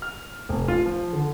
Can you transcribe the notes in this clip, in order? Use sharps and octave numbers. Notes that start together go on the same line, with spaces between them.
F6
F1
F4
F3
D3